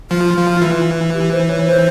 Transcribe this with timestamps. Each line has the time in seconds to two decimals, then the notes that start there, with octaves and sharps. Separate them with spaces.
0.11 F3 F4
0.37 F3
0.62 E3
1.14 G4
1.31 C5
1.48 C#5
1.66 C5